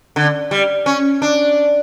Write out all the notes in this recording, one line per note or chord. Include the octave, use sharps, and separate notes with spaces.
D3
G3
C#4
D4